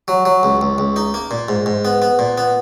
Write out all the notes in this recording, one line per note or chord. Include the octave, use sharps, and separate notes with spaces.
F#3
F#3
C#2
C#2
C#2
D#4
A#3
A#2
G#2
G#2
B3
B3
A#2
B3